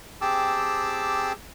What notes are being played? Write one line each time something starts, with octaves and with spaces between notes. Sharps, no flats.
C4 G4 G#4 A5 D6 E6